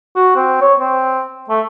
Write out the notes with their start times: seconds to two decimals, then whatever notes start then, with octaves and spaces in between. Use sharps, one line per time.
0.16 F#4
0.36 C4
0.62 C#5
0.80 C4
1.50 A3